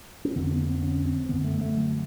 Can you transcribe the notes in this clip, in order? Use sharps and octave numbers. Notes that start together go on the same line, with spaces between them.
C#4
F2 D3 C4
B3
C4
C#4
C4
F#2 D3 B3
A3
A3
F#3